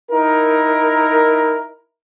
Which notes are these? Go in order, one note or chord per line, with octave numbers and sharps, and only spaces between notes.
D#4 E4 A#4